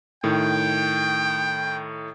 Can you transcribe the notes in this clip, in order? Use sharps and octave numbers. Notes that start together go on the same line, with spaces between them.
A2 D#3 G5